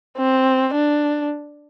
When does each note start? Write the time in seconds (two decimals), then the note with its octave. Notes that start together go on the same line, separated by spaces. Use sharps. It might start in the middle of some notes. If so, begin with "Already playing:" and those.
0.18 C4
0.74 D4